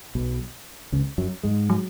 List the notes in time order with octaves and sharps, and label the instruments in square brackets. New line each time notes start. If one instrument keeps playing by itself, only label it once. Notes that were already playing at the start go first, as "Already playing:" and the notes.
[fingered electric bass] B1 B2
C#2 C#3
F#2 F#3
G#2 G#3
[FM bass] F#3